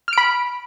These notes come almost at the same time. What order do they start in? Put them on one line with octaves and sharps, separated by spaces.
F6 D7 B5